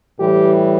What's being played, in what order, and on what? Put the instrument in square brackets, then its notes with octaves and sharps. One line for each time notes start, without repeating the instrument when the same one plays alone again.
[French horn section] A2 E3 G3 G4